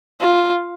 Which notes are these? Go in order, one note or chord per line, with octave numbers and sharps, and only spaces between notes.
F4